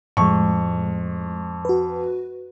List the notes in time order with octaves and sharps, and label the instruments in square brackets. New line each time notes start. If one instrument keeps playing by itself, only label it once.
[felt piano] F2 C#6 [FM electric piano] A2 G#3
[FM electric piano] F#4 B4